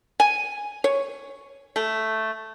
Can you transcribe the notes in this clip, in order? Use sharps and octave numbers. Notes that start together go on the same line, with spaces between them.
G#5
C#5
A3